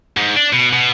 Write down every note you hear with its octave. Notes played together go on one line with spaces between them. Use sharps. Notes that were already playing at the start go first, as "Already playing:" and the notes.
G#2
D4
B2
B2